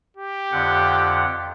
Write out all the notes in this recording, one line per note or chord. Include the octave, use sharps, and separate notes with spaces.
G4
F2 D3 F#5